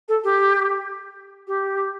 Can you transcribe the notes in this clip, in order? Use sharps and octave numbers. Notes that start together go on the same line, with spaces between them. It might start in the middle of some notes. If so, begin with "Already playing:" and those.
A4
G4
G4